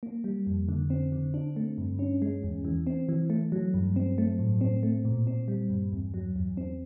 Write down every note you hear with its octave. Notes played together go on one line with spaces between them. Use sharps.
A#3
G3
F2
D3
C4
D3
D4
A3
G2
C#4
G#3
E2
E3
C4
E3
A3
F#3
G2
C4
A3
A2
C4
A3
A#2
C4
G3
G2
E2
F#3
E2
C4